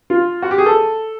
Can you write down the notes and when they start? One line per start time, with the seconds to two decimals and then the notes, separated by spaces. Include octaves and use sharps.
0.10 F4
0.42 F#4
0.51 G4
0.58 G#4
0.66 A4